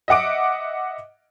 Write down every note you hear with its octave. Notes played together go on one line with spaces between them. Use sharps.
D#5 E5 F#5 D6 D7